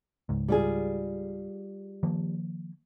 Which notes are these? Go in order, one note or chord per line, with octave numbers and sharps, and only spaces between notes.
C#2 G#2
G3 F4 G#4
D#3 F3 A#3